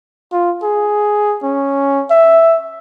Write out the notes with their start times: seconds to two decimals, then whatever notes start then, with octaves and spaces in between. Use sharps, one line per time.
0.32 F4
0.63 G#4
1.43 C#4
2.10 E5